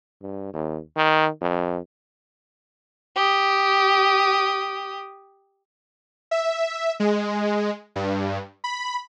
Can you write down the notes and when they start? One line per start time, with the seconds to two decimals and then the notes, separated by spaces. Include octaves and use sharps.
0.22 G2
0.53 D#2
0.97 D#3
1.41 F2
3.15 G4 D#6
6.31 E5
7.00 G#3
7.96 G2
8.64 B5